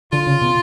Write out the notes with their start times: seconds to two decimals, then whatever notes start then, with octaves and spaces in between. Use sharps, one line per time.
0.12 D3 F4
0.27 C#3
0.41 B2